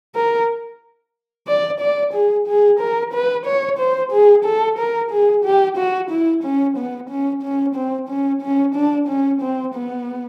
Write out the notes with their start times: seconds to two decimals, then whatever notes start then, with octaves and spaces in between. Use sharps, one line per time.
0.15 A#4
1.47 D5
1.80 D5
2.14 G#4
2.47 G#4
2.80 A#4
3.13 B4
3.46 C#5
3.79 C5
4.12 G#4
4.45 A4
4.78 A#4
5.11 G#4
5.45 G4
5.77 F#4
6.11 E4
6.43 C#4
6.77 B3
7.10 C#4
7.43 C#4
7.76 C4
8.09 C#4
8.42 C#4
8.75 D4
9.08 C#4
9.42 C4
9.74 B3